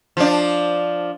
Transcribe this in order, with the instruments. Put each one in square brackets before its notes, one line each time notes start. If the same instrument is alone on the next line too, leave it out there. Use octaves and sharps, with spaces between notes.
[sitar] F3 D4